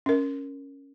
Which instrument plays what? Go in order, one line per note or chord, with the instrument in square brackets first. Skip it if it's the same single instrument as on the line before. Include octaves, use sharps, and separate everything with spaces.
[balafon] C#4 A#4